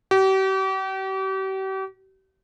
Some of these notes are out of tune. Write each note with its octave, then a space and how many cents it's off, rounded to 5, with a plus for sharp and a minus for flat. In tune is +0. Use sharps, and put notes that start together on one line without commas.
G4 -40